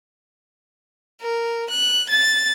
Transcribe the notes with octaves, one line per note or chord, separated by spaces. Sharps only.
A#4
F#6
A6